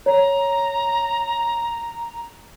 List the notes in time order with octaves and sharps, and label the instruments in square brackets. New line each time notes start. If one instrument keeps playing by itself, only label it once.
[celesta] C#5 [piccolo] A#5